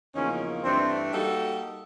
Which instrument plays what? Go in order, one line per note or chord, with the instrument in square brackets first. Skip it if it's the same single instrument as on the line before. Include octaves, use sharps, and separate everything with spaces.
[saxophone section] E2 C#3 F3 A#3 D#4 [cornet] C#4
[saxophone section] G2 E3 A3 D4 [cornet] C4
[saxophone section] G3 A#3 D#4 F#4 A4